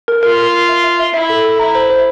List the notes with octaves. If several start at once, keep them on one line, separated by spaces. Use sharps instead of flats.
A#4
F4 A#4
A#4
A#4
E5
E5
E5
E4 E5
A4
A4
E4 A#5
C5
C5